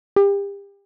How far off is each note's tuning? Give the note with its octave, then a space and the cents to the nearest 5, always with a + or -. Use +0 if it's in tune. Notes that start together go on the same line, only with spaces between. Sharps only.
G4 +35